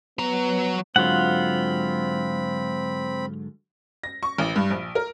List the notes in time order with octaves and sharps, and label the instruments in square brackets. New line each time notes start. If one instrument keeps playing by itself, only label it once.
[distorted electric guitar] F#3 A#5 [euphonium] B3
[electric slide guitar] G#2 D3 F#3 [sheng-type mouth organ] C4 B5 [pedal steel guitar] F4 F#5
[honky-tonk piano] A#6
C#6
A1
G2
A#1
A#4